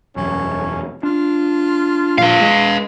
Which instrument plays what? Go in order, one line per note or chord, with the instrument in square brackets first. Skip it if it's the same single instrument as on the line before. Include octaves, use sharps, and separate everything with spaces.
[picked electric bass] E1 F#2 [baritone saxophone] C#4
[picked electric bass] D4 [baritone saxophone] F4
[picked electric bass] A#2 F3 [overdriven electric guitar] B4 F5
[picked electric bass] G#3